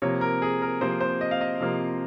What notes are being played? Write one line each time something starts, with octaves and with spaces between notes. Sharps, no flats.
C3 F3 A#3 C#5
A#4
G#4
A#4
C3 F3 A#3 C5
C5
D#5
F5
D#5
C3 F3 A#3